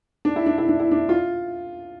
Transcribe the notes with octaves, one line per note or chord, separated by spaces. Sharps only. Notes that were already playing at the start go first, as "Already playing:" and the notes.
D4
E4
D4
E4
D4
E4
D4
F4